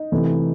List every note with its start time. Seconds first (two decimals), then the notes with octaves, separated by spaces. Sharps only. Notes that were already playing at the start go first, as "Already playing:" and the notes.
Already playing: D#4
0.12 C3 E3 A3